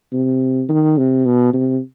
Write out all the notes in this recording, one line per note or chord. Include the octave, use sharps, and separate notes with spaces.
C3
D#3
C3
B2
C3